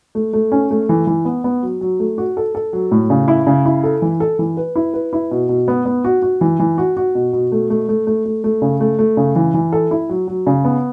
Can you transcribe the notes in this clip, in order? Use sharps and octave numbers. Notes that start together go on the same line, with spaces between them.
A3
A3
C#4
A3
E3
E3
B3
B3
F#3
F#3
A3
F#4
A4
A4
F#3
A2
C#3
E4
C#3
E4
A4
E3
A4
E3
B4
E4
B4
E4
B2
B2
B3
B3
F#4
F#4
E3
E3
F#4
F#4
B2
B2
A3
A3
A3
A3
A3
A3
C#3
A3
A3
C#3
E3
E3
A4
E4
F#3
F#3
C#3
B3